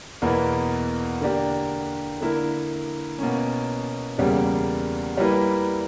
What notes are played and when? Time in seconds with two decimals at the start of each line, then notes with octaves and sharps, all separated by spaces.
0.22 E2 B2 A#3 E4 B4
1.21 D3 A#3 D4 G4
2.21 D3 A#3 E4 A#4
3.18 B2 A#3 C#4
4.18 E2 C#3 G3 A#3
5.18 G3 A#3 E4 B4